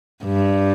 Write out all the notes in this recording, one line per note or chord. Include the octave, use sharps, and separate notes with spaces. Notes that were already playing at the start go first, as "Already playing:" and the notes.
G2